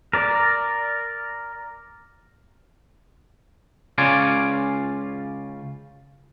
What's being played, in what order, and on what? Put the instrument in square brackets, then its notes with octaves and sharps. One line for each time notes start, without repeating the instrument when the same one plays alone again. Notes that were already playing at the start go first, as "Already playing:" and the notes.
[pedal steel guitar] A#4 D5
[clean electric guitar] C#2 C#3 C#4 F4 D5 G#5